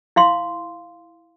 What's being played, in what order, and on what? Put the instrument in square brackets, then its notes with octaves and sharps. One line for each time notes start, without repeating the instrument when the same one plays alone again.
[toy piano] E4 F5 C6